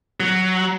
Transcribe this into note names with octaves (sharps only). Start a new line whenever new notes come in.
F#3